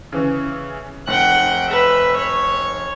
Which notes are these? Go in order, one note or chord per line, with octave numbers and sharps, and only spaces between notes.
C#3 E3 C#4
F1 F#5 G5
B4 E5
C#5